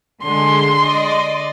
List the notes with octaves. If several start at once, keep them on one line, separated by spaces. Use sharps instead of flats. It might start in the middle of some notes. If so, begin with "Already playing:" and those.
D3 G#3 C6
D5 D#5